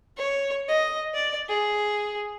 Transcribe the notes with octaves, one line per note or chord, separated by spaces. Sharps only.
C#5
D#5
D5
G#4